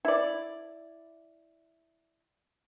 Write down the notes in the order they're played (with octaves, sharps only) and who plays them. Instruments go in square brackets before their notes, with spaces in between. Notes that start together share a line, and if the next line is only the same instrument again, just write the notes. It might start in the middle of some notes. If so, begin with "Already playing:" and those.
[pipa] E4 D5